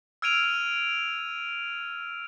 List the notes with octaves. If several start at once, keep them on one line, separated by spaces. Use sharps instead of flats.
E6 F6 G#6 D7 D#7 F7